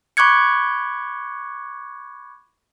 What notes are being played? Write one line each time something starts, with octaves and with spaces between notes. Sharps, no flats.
B5 C#6 D6 F#6 G#6 C#7